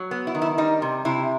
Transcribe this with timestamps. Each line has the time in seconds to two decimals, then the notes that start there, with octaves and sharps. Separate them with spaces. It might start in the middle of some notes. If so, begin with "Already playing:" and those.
Already playing: F#3
0.11 B3
0.27 E4
0.35 D#3
0.42 E4
0.58 G3 D#4
0.82 C3
1.05 C3 E4